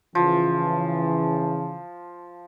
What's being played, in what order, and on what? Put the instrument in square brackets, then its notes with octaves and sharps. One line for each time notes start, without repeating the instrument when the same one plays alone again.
[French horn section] C#3 E3 [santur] F3